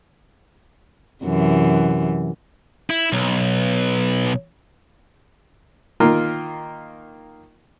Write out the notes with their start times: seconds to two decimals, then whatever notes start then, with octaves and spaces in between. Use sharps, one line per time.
1.23 F#2 C3 E3
2.90 E4
3.12 B1
6.00 D#3 A#3 F4 A#4